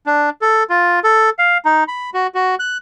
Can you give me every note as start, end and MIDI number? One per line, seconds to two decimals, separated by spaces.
0.06 0.30 62
0.42 0.63 69
0.70 1.00 65
1.04 1.30 69
1.39 1.58 77
1.65 1.84 63
1.88 2.10 83
2.14 2.27 66
2.35 2.55 66
2.59 2.77 90